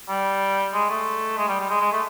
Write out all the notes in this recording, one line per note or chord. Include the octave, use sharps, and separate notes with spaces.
G3
G#3
A3
G#3
G3
G3
G#3
G#3
A3